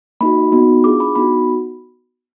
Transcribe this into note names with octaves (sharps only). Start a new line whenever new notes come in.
A#3 D#4 F#4 B5
B3 D#4 F#4
D4 F4 G#4 D6
B5
B3 D#4 F#4 B5